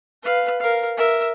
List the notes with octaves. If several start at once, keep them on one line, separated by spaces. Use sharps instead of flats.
B4 F5
A#4 F5
A#4 E5